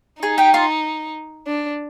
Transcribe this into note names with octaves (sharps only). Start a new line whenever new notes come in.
D#4 G#4 G#5
G4 G5
F4 F5
D4